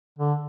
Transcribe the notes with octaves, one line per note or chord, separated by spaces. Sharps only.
D3